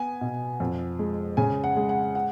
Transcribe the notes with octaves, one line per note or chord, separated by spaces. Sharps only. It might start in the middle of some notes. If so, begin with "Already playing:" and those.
Already playing: B3 G#5
B2
F2
G#3
C#3 G#5
F#5
G#3
F#5
F#5